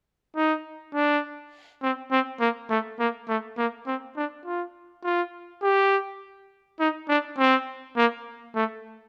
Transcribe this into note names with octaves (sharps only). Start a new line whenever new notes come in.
D#4
D4
C4
C4
A#3
A3
A#3
A3
A#3
C4
D4
F4
F4
G4
D#4
D4
C4
A#3
A3